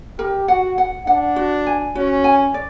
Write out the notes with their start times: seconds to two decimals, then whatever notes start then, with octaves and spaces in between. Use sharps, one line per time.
0.18 G4 A#4
0.48 F#4 F#5
0.78 F#5
1.07 D4 F#5
1.36 F#4
1.66 G#5
1.95 C#4 F#4
2.24 G#5
2.54 D5